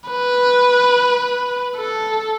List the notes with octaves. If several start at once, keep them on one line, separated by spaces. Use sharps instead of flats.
B4
A4